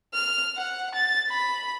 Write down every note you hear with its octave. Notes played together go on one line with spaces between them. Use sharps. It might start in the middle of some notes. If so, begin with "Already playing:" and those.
F6
F#5
A6
B5